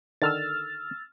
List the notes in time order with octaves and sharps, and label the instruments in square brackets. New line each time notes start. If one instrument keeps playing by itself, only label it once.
[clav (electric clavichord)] D3 D#3 [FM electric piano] E6 F6 A6